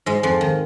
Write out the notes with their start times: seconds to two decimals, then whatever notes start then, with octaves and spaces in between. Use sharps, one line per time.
0.06 G#2 G#3
0.23 F2 F3
0.41 D#3